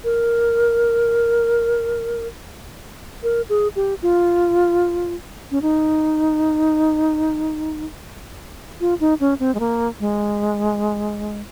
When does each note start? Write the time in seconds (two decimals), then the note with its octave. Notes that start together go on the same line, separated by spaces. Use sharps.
0.04 A#4
3.23 A#4
3.49 G#4
3.76 G4
4.02 F4
5.51 C#4
5.62 D#4
8.80 F4
9.00 D#4
9.20 C#4
9.40 C4
9.54 G#3
9.60 A#3
10.00 G#3